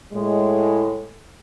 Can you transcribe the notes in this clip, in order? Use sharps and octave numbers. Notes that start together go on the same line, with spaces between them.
A2 G#3